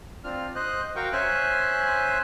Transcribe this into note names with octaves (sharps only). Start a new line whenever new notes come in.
C4 D4 F4 F6
C5 D#5 F#6
F#4 A#4 F5 G5 C#6
C#4 C5 E5 G#5 F#6